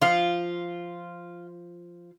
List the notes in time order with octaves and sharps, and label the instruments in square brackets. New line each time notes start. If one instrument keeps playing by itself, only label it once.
[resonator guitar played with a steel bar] F3 F5 [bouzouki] F4